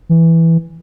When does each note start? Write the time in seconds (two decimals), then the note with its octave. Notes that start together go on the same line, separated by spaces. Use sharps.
0.09 E3